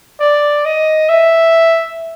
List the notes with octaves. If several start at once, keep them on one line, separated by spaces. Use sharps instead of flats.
D5
D#5
E5